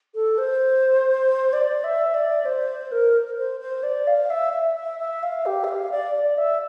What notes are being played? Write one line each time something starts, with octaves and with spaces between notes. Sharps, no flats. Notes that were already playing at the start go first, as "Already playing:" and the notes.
A4
C5
D5
E5
D5
C5
A#4
C5
C5
D5
F5
E5
E5
E5
E5
F5
G4
E5
F5
D5
D5
E5